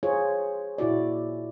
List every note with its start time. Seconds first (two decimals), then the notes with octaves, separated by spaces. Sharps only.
0.03 F4 G#4 C5 C#5
0.78 A#2 E4 F#4 D5